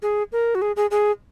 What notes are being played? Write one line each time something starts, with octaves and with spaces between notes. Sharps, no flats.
G#4
A#4
F#4
G#4
G#4
G#4